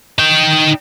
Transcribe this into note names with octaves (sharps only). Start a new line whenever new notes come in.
D#4 G5